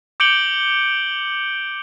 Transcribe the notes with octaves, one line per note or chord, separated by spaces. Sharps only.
D6 G6 C#7 D7 F#7 G7